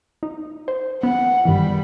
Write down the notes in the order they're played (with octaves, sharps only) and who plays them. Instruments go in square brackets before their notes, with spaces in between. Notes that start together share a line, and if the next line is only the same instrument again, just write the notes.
[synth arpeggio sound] D#4
C5
[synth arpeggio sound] B3 [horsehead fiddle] F#5
[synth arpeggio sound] G2 D#3 E3 [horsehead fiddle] G3 B5